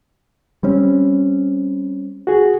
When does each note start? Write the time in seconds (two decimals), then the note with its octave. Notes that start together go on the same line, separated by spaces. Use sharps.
0.63 G3 C4 C#4
2.27 F#4 G#4